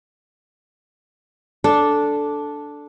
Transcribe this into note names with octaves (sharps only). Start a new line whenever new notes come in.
D4 A4